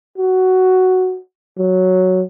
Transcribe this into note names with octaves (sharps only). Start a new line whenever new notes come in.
F#4
F#3